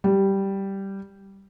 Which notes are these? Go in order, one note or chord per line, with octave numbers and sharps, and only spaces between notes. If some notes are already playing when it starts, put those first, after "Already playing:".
G3